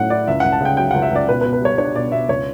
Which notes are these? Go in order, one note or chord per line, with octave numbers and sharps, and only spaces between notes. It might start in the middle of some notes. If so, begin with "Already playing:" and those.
Already playing: A2 F#3 C#4 F#5
E4 D5
C#2 E5
C#2 F#5
A5
C#3 G5
F#3 G5
C#2 F#5
E5
C#2 D5
B2 B4
B4
B2
B4
G3 C#5
D4 C#5
B2 D5
B2 E5
C#2 C#5